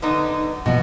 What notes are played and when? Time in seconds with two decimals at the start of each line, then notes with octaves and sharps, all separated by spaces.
0.02 D3 B3 D#4
0.66 B2 F3